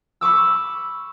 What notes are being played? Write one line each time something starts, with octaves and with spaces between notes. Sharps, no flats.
B5 C#6 D6 E6